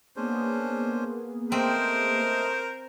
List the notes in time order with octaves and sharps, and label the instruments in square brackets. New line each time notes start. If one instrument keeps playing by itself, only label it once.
[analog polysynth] A#3 B3 G#4 [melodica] C#4 D4 C5
[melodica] A3 D#5 [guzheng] C4 [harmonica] A#4 C5